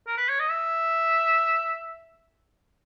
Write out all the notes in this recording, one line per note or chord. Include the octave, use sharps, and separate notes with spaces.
A#4
B4
C#5
D#5
E5